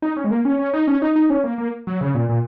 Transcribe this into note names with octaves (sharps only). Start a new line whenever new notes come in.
D#4
C#4
G#3
A#3
C#4
C#4
D#4
C#4
D#4
D#4
C#4
A#3
A#3
F#3
C#3
A#2
A#2